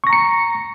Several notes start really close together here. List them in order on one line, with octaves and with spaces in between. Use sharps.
C#6 A#6 A#5 C#7